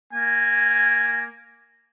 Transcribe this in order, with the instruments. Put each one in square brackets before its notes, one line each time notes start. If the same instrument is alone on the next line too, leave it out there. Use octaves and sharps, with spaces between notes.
[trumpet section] A#3 G#5